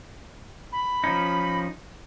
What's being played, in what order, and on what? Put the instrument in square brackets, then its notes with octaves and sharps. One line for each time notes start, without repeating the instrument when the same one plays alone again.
[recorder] B5
[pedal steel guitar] F3 C#4 D#4